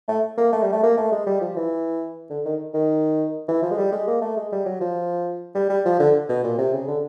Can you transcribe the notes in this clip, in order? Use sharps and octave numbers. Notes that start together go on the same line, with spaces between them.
A3
A#3
A3
G3
A3
A#3
A3
G#3
G3
F3
E3
D3
D#3
D#3
E3
F3
G#3
G3
G#3
A#3
A3
G#3
G3
F#3
F3
G3
G3
F3
D3
B2
A#2
C3
C#3
D3